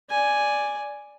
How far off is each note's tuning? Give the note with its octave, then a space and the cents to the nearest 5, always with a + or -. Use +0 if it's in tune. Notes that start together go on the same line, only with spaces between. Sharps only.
D5 +0 G#5 +0